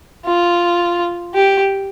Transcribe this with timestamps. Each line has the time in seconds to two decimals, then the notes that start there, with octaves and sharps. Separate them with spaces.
0.25 F4
1.34 G4